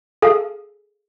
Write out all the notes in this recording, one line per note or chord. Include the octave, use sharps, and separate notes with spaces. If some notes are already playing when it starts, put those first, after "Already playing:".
G#4 A4 F5